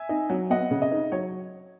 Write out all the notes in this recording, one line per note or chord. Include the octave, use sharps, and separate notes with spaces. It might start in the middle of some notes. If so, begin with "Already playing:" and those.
Already playing: E5 G#5
D#4
F#3
B3 D#5 F#5
C#3
D#5
D#4
F#3 C#5